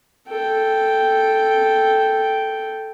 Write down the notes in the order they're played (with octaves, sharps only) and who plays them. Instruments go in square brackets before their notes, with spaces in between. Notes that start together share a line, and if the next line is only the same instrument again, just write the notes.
[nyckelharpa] A4 G5